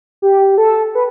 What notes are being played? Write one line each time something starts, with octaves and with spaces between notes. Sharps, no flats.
G4
A4
B4